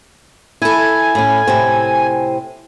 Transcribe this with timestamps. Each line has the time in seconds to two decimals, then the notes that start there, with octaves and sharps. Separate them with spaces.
0.62 E4 A4 G#5
1.15 A2 C#4
1.47 A2 C3 C4